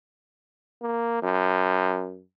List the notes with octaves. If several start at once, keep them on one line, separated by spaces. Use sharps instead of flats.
A#3
F#2